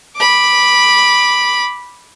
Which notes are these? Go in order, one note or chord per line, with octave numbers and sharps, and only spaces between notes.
B5 D6